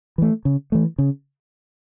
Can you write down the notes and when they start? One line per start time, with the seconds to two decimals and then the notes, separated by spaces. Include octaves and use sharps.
0.18 E3 A3
0.45 C#3
0.72 E3 A3
0.98 C#3